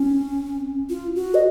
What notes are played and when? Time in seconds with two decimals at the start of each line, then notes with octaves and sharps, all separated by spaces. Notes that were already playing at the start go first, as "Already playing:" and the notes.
Already playing: C#4
0.90 F4
1.16 F#4
1.34 D#5